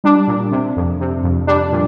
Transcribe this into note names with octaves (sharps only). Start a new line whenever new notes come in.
G3 D4
A#2
C3
F2
C3
F2
G3 D4
A#2